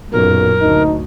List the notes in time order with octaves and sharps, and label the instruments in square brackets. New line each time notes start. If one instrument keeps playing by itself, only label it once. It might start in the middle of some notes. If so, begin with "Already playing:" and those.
[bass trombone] B1 [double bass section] F#2 A#2 [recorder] A#4
[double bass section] D2 [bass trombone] D#4